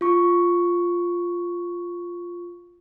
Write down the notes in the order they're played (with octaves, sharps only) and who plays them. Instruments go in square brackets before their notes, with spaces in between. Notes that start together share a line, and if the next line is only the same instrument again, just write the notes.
[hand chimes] F4 C#6